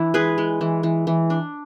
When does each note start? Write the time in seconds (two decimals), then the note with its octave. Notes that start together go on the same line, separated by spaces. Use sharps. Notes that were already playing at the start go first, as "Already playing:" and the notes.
Already playing: E3 D4 E4
0.14 G#3 G#4 B4
0.38 G#3
0.61 E3
0.83 E3
1.07 E3
1.30 D4